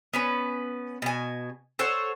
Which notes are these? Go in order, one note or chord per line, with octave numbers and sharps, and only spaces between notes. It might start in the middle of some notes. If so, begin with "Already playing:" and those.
B3 C#4 B4
B2 G#5
A4 C5 C#5 F#5